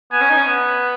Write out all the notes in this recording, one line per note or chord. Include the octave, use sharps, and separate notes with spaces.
B3 G#5
C#4
D#4
C#4
B3